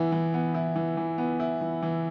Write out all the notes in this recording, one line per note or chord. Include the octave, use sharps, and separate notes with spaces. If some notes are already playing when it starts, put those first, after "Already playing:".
Already playing: E3 B3 E4
E3
B3
E4
E3
E3
B3
E4
E3
E3